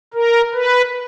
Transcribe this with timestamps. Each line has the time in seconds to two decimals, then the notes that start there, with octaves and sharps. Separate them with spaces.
0.14 A#4
0.54 B4